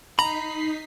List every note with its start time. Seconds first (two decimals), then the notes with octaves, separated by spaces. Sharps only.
0.19 D#4 A#5 B5 B6 C7